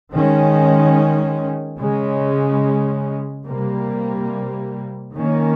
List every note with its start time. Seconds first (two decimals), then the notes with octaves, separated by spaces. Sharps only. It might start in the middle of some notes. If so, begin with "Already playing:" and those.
0.11 D#3 G#3 C#4
1.79 C#3 G#3 C#4
3.47 C3 G3 A#3
5.15 D#3 A#3 C#4